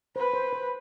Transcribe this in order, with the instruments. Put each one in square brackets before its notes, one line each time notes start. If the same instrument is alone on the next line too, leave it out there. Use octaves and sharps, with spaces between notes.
[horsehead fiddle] B4 [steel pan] C5
[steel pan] C5
C5